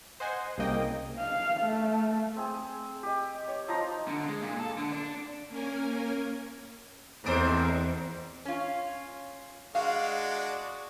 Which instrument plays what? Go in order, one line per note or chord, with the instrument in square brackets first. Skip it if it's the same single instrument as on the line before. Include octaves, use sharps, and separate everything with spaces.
[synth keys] C5 D#5 F#5 G#5
C2 C#3 A#3 D#5 G5
[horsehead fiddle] F5
A3
[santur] C4 G#4
G4 D#5
C#5
F3 D#4 A#5 C6
[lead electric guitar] D3
G#3
A#2
A4
D3
D4
[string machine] A#3 C#4 A#4 G#5
[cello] E2 C4 [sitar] G#2 A3 C5
[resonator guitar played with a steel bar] C#4 F4
[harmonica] G#3 D4 F#4 [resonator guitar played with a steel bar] F5